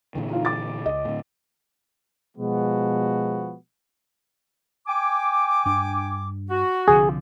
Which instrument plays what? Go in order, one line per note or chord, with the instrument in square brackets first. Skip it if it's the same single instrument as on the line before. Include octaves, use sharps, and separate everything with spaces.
[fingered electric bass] A#2 D3 E3
[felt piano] D#4 F4 F5
D6 A6
[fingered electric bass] C#2 [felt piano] D#5
[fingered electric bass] A2 D3
[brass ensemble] B2 F3 G#3 B3 F#4
[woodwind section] G5 G#5 D6
[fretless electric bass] G2 D4
[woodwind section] F#4
[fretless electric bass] C2 D3 F3 [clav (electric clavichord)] G#4